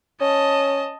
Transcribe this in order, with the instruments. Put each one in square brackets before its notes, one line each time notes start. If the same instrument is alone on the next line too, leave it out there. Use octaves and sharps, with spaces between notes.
[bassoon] C#4 [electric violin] D#5 A5